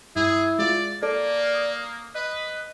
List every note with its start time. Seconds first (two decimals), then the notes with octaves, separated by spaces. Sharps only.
0.16 G2 E4 G#4
0.59 G#3 F4 D5
1.03 A#3 A4 D5
1.54 D#6
2.15 B4 D#5